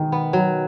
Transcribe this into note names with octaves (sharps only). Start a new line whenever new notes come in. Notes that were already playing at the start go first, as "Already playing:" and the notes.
Already playing: B2 D#3 G#3
B3
F#3